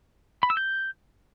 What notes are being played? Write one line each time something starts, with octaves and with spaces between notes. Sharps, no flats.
B5
E6
G6